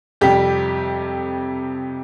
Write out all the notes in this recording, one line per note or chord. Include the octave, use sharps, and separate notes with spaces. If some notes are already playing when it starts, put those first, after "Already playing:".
F2 C3 G3 G4